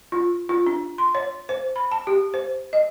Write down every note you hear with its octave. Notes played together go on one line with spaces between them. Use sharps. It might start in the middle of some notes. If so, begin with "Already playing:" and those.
F4
F4
D4
C6
C#5
C5
B5
A5
G4
C5
D#5